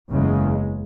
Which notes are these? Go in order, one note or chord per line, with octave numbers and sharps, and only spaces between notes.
F#1 E2 C#3 G#3